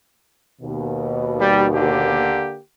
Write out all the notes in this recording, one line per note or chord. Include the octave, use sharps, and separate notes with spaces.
D#2 B2
G3
D3 A#3 G4